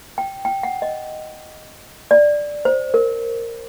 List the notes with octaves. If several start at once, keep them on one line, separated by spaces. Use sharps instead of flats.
G5
G5
F#5
D#5
D5
C5
A#4